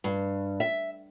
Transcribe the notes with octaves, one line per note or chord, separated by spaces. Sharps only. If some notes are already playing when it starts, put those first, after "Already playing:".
G2
E5